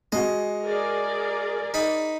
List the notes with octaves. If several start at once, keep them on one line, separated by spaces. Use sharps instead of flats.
G#3 F#4 D#5
G#4 A#4 D5
D#4 B5